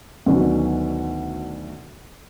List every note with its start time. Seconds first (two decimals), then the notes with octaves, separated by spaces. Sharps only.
0.26 D2 B2 D3 D#3 F#3 C#4